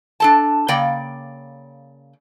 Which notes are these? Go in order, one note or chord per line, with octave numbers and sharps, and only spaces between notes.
D4 A4 A5
C#3 A#3 D5 G5